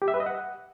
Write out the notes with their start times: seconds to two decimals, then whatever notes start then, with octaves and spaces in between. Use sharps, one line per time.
0.02 G4
0.08 E5
0.14 B4
0.20 D#5
0.26 F#5